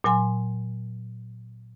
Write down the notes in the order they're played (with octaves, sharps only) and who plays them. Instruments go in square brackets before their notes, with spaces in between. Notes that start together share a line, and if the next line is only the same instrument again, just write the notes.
[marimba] A#2 F#3 G#5 C6